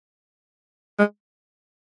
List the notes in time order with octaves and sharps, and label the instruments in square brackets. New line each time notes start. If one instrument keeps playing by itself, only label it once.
[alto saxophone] G#3